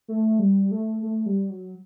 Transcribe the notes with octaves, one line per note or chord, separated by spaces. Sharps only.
A3
G3
A3
A3
G3
F#3